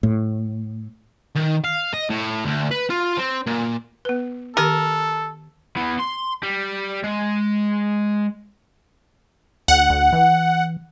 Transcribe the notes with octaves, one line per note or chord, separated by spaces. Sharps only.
A2
D#3
F5
D#5
A2
D2
B4
F4
C4
A#2
B3 B4
D#3 G4 A4 A#4
B3 E4
C6
G3
G#3
D2 F#5
D2
E3